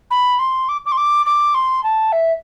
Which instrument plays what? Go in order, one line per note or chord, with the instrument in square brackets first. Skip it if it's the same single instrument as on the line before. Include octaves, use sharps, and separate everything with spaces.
[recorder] B5
C6
D6
D6
C6
D6
D6
C6
A5
E5